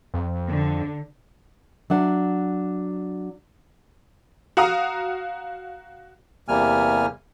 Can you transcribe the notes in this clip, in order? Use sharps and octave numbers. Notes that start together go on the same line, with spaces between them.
F2
D3
F#3 D4 F#5
F#4 F5 A#5 D#6
E2 C3 G3 A#3 G#5 F6